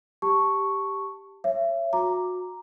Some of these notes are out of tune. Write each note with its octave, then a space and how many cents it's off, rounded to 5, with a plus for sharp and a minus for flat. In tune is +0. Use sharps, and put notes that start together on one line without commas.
G4 +0 A5 +10 C#6 +0
C#5 -10 E5 +30
F#4 -25 A#5 +0 D6 +0